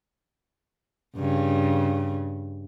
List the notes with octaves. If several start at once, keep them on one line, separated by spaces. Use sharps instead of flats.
G2 C#3